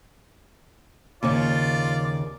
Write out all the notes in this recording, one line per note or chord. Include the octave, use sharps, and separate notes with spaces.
D#2 C#3 F4 C#5 D5